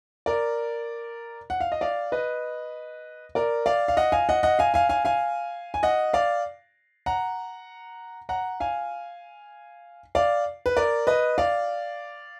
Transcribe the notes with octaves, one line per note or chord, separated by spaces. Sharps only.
A#4 D5
F#5
F5
D#5
D5 F5
B4 D#5
A#4 D5
D5 F5
F5
D#5 F#5
F5 G#5
D#5 F#5
D#5 F#5
F5 G#5
F5 G#5
F5 G#5
F5 G#5
G#5
D#5 F#5
D5 F5
F#5 A#5
F#5 A#5
F5 G#5
D5 F5
B4
A#4 D5
B4 D#5
D5 F5